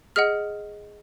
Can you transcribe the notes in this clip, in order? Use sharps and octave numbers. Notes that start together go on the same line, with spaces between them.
G#4 D#5 F#5 F6